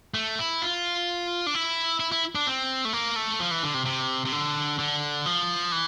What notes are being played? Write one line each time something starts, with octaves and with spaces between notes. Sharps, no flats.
A3
E4
F4
D4
E4
E4
E4
D4
C4
A3
A#3
A3
F3
E3
D3
C3
C3
C3
D3
D3
F3
E3